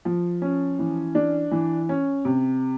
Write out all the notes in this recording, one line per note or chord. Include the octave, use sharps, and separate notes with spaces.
F3
C#4
E3
D4
E3
C#4
C3